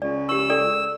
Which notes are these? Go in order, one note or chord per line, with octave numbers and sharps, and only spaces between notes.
C#2 D5
G4 C#6 E6
A4 D5